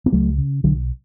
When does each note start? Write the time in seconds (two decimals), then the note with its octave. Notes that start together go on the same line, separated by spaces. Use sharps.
0.06 B3
0.13 C#2 F#3 A3
0.38 C#3
0.64 B1 D3 F#3